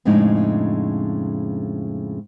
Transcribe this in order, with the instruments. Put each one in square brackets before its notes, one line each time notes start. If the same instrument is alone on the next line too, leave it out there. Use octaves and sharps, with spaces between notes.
[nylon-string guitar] F2 A2 C#3 G#3 D4 D#4